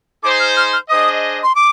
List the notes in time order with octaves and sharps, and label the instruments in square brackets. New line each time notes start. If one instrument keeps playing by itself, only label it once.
[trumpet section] D#4 G#4 C5 [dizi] D6
[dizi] F6
F6
F6
[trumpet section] D4 G#4 C5 D#5 [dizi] D#6
[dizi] C6
D6